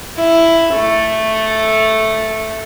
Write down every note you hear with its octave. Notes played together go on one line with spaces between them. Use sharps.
E4
A3